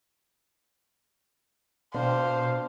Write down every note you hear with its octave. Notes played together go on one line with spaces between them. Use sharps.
B2 D4 C5 D5 F5 G5